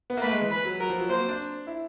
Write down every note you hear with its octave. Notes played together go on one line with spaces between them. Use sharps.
B3
A#3
A3 B4
G#3
E3
B4
F#3
F#3 A#4
F3
F#3
A#3 C5
C4
D4
E4